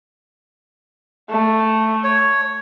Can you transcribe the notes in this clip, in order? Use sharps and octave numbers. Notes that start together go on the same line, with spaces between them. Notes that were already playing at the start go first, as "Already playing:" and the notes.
A3
C#5